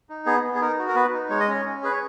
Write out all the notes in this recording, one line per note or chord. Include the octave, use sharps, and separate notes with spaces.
D#4
B3 G#4
B3
G#4
D#4 A#4
F#4
A#4
B3 B4
D#4
G#3 C#5
D#5
C#4 C#5
C#4
G#4 B4
C#5